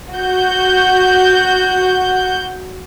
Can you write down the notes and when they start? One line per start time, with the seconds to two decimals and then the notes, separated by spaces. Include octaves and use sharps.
0.14 F#4 G6